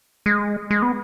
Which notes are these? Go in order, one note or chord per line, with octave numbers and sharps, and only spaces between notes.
G#3
G#3
B3